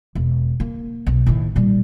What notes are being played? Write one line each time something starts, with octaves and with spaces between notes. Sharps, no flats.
E1
A#3
B1
A2 D#3
A#2 G3